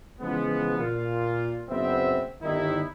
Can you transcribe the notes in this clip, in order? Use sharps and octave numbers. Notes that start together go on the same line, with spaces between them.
C#3 E3 F3 G#3 B3
A#2 F4
F#1 B3 C4 E5
G1 D#3 D#4 E4